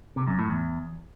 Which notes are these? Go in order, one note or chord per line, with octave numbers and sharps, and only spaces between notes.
C3
F#2
A2
E2